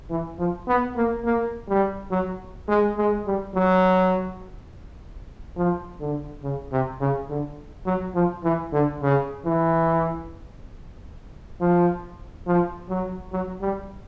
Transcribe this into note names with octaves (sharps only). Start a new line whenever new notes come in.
E3
F3
B3
A#3
A#3
G3
F#3
G#3
G#3
G3
F#3
F3
D3
C#3
C3
C#3
D3
F#3
F3
E3
D3
C#3
E3
F3
F3
F#3
F#3
G3